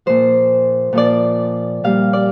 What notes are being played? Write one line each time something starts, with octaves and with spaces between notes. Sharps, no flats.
A#2 F3 C5
A#2 F3 D5
A#2 G3 F5
D5